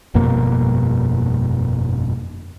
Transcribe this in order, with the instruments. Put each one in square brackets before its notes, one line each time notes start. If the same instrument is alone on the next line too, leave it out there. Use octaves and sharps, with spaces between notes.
[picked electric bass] G1 F2 B2 A#3